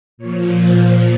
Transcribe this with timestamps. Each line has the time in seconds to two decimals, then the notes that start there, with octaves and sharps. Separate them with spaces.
0.18 A#2 F3 C#5
0.55 C5